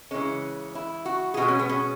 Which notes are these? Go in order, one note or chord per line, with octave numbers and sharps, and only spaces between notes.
C#3 E3 G#3 C#4
E4
F#4
G#4
B2 G#3 F#4
C#4
B3
C#4